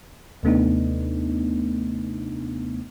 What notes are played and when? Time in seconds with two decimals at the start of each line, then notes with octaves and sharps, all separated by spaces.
0.43 D#2 C3 A3 B3 D4 D#4